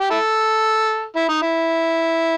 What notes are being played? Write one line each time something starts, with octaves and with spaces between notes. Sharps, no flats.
G4
E4 A4
E4
D#4
E4